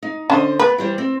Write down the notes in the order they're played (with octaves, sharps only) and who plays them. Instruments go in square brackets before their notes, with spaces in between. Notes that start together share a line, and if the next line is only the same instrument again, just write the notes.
[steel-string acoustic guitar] D#4
[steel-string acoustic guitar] D3 C5 D#5 [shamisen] C#4 D4
[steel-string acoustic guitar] B3 [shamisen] B4
[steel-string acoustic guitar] E3 G3 C5
C4